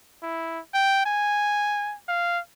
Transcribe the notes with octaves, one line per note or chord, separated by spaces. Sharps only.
E4
G5
G#5
F5